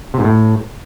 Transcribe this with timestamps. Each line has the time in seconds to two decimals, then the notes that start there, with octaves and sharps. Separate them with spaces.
0.14 C3
0.19 G#2
0.24 A2